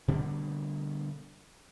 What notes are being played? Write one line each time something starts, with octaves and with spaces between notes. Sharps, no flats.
B2 D3 G3 A#3